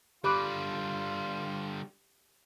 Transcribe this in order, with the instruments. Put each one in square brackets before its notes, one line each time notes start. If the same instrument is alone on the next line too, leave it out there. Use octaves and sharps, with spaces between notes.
[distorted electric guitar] D3 G3 [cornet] F4 [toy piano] G4 [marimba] B5 D6 F#6